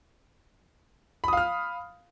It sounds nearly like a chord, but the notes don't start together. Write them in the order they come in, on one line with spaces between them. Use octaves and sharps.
B5 D#6 F5 F6